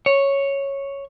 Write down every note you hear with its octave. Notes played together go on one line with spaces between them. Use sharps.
C#5